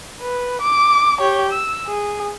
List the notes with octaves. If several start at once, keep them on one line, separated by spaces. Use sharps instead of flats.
B4
D6
G4 C#5
E6
G#4